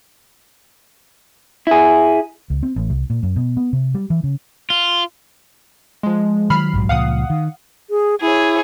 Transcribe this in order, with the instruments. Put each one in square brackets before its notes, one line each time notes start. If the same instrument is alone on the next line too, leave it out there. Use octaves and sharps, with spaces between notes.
[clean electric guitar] E4 G#4
[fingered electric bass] C#2
C4
A1
C2
A#2
F#2
B2
B3
C3
G3
E3
C#3
[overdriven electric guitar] F4
[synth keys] F3 G#3
[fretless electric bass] D#3 F#3 [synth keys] B5 F6 C7
[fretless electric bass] A#1 G#2 F#3
[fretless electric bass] C#2 A#2 F3 [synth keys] F5 F#5 D#6
[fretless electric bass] D#3
[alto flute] G#4
[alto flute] E4 [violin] G#4 C#5